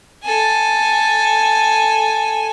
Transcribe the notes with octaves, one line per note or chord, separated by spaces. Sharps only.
A4 G#5